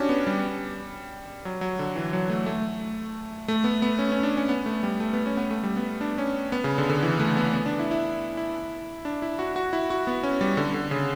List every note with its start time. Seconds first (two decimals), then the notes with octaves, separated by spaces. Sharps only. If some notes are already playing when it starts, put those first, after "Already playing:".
Already playing: C#4 D4 F#4 G4
0.09 B3
0.27 G3
1.45 F#3
1.61 F#3
1.79 D3
1.96 E3
2.13 F#3
2.30 A3
2.46 A3
3.48 A3
3.64 B3
3.82 B3
3.99 C#4
4.12 C#4
4.23 D4
4.37 C#4
4.49 B3
4.66 A3
4.83 G3
5.00 A3
5.13 B3
5.26 C#4
5.37 B3
5.51 A3
5.63 G3
5.76 B3
6.01 D4
6.18 C#4
6.52 B3
6.64 C#3
6.78 D3
6.89 D3
7.03 E3
7.19 A3
7.37 B3
7.53 B3
7.66 D4
7.79 E4
7.91 E4
8.37 E4
9.05 D4
9.22 E4
9.39 F#4
9.56 F#4
9.73 E4
9.90 F#4
10.07 B3
10.23 C#4
10.41 G3
10.57 D3
10.74 D3
10.91 C#3